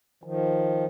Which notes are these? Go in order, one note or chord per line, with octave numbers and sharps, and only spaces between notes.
D#3 F3